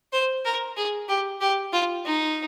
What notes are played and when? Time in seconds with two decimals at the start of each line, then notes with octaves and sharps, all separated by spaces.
0.13 C5
0.45 A#4
0.77 G#4
1.09 G4
1.41 G4
1.73 F4
2.05 D#4